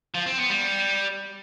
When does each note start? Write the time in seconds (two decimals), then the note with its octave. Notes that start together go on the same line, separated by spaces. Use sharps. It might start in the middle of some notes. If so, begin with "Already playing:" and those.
0.14 F3
0.26 C4
0.38 B3
0.50 G3